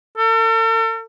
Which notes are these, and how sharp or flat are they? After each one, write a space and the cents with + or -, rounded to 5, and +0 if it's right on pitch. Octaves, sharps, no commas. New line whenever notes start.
A4 +45